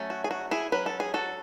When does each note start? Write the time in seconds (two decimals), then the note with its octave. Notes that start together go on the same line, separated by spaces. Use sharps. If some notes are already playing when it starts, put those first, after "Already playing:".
Already playing: F#3 A3 C#4
0.10 F#4
0.24 G#4
0.31 F#4
0.51 E4 G#4
0.72 F#3 C#4 B4
0.86 A4
1.00 G#4
1.14 F#4 A4